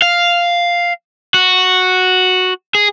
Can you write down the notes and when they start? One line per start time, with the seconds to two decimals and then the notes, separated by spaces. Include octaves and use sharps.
0.02 F5
1.34 F#4
2.75 G#4